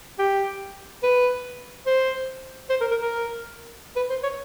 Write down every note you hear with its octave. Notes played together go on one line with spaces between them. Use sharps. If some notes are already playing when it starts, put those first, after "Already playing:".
G4
B4
C5
C5
A#4
A#4
A#4
B4
C5
C#5